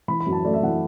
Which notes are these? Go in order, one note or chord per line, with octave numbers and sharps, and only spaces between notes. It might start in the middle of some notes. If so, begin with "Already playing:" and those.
E3 B5
B5
F#2
A5
A3 D5
E5
E3 F#5